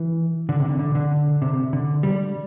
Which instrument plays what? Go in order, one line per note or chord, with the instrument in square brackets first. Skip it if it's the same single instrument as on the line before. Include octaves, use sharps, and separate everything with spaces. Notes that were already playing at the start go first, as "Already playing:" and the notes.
Already playing: [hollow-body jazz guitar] E3
D3
C3
D3
D3
D3
C3
D3
G3